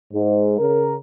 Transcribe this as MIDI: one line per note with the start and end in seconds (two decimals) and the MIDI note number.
0.12 0.54 44
0.59 0.95 49
0.59 0.95 70